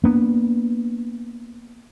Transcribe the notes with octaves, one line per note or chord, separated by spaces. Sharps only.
A#3 B3 D4